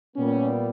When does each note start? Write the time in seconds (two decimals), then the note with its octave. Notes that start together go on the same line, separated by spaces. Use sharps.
0.16 A#2 G3 B3 C#4